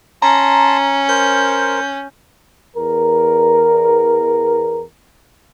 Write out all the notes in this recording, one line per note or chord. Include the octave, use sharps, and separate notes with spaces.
C#4 A5 A#5 C6
A#4 C5 G6
E2 A#4